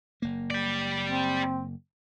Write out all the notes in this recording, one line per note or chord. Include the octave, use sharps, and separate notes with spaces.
F#1 A#3
G4 D5
C4